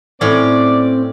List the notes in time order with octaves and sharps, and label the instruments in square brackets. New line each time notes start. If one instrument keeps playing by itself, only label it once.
[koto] A2 C#4 [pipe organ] C4 [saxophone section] D5